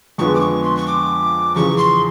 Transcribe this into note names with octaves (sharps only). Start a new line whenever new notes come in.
F2 D3 F3 G#3 B3 C#6
D6
C#6
C6
C#6
D6
E2 C#3 F3 C#6
C6